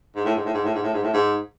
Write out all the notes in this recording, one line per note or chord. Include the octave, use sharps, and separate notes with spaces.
G#2
A2
G#2
A2
G#2
A2
G#2
A2
G#2
A2
G#2